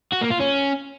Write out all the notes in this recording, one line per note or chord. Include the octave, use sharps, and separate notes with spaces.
F#4
A#3
F4
C#4